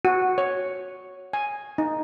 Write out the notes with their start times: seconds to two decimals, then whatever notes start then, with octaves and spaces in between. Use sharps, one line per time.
0.05 F#4
0.38 C#5
1.33 G#5
1.78 D#4